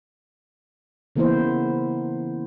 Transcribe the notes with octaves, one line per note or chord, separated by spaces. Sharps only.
C#3 E3 A#3 B3 E4 C5